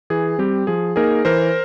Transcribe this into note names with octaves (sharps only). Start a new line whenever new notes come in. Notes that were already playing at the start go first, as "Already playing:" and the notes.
E3 G#4
G3 C4 G4
F3 G#4
A#3 D#4 G#4 A#4
E3 A#4 C5